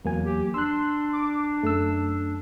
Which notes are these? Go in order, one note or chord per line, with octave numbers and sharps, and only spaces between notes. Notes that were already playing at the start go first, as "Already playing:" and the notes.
E2 F#3 A#3 G#5
G4
D4 C6 E6 F#6
D6
F#2 A3 A4 E6